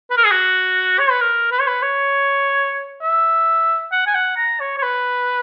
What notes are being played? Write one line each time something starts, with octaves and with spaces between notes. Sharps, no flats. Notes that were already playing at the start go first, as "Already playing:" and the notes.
B4
A#4
G#4
F#4
C#5
B4
A#4
B4
C#5
B4
C#5
E5
F#5
G#5
F#5
A#5
C#5
C#5
B4